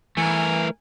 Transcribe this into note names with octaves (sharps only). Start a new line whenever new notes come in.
E3 A3 A#4 G#5